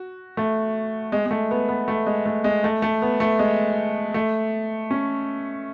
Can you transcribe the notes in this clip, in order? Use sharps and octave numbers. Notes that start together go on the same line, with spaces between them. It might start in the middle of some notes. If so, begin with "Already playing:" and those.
Already playing: F#4
A3
G#3
G#3
A3
B3
B3
A3
G#3
A3
G#3
A3
A3
B3
A3
G#3
A3
C#4